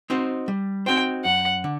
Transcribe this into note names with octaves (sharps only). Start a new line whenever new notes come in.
C4 D#4 F#4 C5
G3
C4 D#4 F#4 C5 G5
F#2 F#5
D3